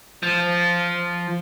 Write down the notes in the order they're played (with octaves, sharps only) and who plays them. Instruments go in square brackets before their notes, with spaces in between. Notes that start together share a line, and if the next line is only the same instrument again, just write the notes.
[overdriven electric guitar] F3